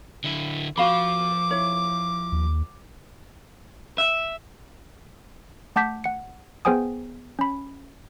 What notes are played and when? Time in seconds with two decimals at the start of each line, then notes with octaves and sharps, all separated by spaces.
0.24 D3 E4
0.78 F3 F#4 F5 B5 D6
1.51 E4 C#5
2.32 D#2
3.98 E5
5.76 A3 F#5 A5 D6 G6 B6
6.04 F#5 C#7
6.65 B3 G#4 C5 G5 G#5 D#6
7.39 C#4 B5